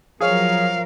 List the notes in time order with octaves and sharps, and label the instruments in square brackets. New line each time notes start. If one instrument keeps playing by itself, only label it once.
[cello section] F3 F#3 A#4 [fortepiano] G#4 C#5 [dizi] F5